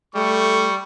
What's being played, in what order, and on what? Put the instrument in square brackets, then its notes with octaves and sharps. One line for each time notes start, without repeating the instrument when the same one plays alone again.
[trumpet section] G3 C#6 [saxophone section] A3